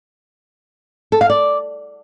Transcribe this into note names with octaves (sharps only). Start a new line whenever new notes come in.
A4
F5
D5